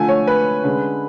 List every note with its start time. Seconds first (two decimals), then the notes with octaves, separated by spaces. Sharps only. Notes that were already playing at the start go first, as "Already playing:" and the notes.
Already playing: D3 F3 A3 G#5
0.08 C#5
0.27 B4
0.64 D3 G#3 C#4